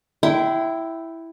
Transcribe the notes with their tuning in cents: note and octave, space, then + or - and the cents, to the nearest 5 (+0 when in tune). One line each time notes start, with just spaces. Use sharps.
E4 +0 G5 -15 C6 -30